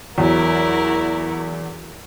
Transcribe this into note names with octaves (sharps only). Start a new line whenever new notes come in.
E2 F#3 E4 F#4 A#4